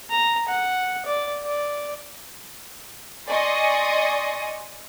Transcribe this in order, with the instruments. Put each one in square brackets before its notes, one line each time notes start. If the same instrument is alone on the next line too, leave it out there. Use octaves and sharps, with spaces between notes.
[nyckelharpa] A#5
F#5
D5
D5
[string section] D5 D#5 G#5 C6 C#6 D#6